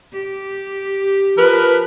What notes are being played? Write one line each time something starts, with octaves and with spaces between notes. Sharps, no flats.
G4
F3 A#4 B4